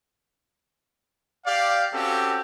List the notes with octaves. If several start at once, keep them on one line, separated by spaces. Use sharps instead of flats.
G4 D5 F5
C4 C#4 F#4 G4 A4